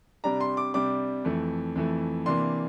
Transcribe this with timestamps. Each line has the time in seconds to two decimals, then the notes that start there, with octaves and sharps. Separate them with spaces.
0.24 C3 G3 D4 A#5
0.40 C6
0.57 D6
0.74 C3 G3 D4 D6
1.25 F2 E3 A3
1.76 F2 E3 A3
2.26 C3 E3 A#3 D4 C6